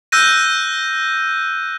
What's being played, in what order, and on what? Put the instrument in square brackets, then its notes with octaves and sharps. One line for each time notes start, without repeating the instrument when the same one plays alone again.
[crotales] E6 F#6 G6 A#6 D#7